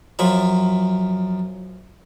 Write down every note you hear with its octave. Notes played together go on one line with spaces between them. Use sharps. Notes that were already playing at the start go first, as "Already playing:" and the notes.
F#2 F3 E5